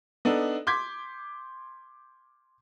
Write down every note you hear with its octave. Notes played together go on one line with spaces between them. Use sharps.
B3 D4 D#4 A4
C6 D6 G6 G#6 B6